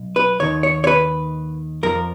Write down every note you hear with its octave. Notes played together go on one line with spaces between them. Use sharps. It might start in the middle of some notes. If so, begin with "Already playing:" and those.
Already playing: B1
B4
D#2 D#3 C#5
C#5
C#5
B4
F2 F3 A#4